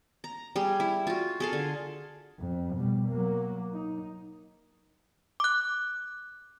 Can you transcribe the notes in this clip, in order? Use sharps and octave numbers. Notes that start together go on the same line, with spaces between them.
A#5
G3 G#4
E4
F4 F#4
G#4 A4 F5
D3
F2
B2 G3
F#3 A#3
D#4
D6 F#6